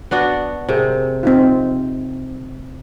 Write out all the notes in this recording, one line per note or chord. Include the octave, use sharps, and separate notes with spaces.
B3 D4 F#4
C3 G#4 A#4
C4 D#4 F4